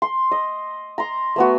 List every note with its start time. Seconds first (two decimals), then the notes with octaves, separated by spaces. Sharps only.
0.02 C6
0.31 D#5
0.98 A#5 C6
1.36 A3 B3 F#4